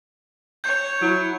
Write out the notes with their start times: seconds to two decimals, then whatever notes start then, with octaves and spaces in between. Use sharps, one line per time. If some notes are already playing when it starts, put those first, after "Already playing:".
0.64 C#5 G6
1.01 F#3 E4